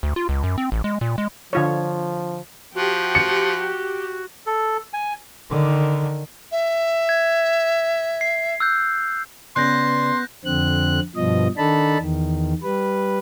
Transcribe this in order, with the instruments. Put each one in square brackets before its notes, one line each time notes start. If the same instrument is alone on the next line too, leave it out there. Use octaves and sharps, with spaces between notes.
[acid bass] D2
F4
C#2
F#2
C4
A1
G#3
A#2
G#3
[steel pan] D3 F4 C#5 [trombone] F3
[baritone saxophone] F3 [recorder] F#4 [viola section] G4
[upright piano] C#7
[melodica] A4
G#5
[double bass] D3 D#3
[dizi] E5
[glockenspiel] G#6
C7
E6 F#6 G6
[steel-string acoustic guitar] C#3 D5 [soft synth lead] B3 [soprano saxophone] C6 [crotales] F#6 G6 A#6
[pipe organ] F2 D3 C4 F#6
G2 B2 F3 D#5
D#3 D4 D#4 A4 A5 B5
E2 D#3
G3 B4